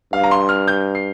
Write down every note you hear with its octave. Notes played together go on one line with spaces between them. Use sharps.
G2 F5
A#5
C6
F6
G6
C7